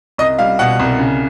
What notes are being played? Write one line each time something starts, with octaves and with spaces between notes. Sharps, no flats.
C2 D#5
G3 F5
B2 F#5
C2
C#3